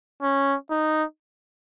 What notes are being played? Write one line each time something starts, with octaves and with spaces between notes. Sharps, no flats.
C#4
D#4